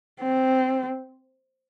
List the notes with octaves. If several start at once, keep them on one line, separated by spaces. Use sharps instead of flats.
C4